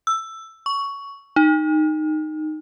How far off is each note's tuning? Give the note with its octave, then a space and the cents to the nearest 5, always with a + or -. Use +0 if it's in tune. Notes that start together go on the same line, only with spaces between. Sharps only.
E6 +10
C#6 +10
D#4 -10